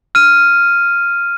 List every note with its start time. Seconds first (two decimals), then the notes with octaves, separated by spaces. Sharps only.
0.15 F6 D#7